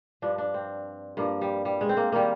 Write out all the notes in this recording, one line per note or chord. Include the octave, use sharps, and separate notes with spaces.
G2 F3 D4
D4
C4
G2 F3 A#3
G3
G3
G#3
C4
A#3
D#3 G3 A#3